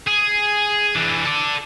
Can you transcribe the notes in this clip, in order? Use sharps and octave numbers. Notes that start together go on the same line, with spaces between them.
G#4
E3 D4
A4 D5